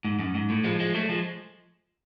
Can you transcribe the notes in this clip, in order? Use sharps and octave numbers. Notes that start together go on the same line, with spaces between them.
G#2
F#2
G#2
A2
F3 G#3
F3 G#3
F#3 A3
F3 G#3